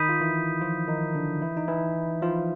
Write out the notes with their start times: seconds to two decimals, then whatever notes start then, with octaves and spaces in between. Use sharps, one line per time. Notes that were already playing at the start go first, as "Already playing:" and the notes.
Already playing: D#3 D#4 B5 D#6 G6 B6 D#7
0.09 F4
0.21 E3 E4
0.61 F3 F4
0.88 D#3 D#4
1.15 D3 D4
1.42 E3 E4
1.57 D#4
1.68 E3 E4
2.22 F3 F4